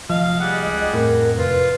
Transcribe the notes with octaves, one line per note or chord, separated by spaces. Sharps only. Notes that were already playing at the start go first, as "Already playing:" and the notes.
F1 F3 D#5 F5
G3 G#4 F#5
C#2
F2 A2 A#4
F1 F4 B4